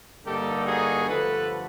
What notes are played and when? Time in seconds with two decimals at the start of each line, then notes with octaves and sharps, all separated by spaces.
0.25 G2 D3 G3 A#3 D#4 G4 A4
0.66 F#4 G#4
1.07 G2 D3 F3 A3 A4 B4